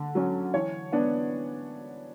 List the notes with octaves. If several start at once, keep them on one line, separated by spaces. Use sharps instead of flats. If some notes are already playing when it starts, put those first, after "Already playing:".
Already playing: D3
F#3 C#4
E3 C#5
B3 D4